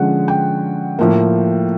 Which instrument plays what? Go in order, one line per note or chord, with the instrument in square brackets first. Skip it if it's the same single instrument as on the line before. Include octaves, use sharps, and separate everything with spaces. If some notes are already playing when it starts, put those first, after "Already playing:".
Already playing: [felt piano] D3 F3 G#3 C#4 F#5
G5
A2 F3 A#3